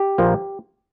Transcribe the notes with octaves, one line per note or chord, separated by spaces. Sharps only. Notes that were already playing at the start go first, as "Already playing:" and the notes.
Already playing: G4
A#1 A#2 F3 A#3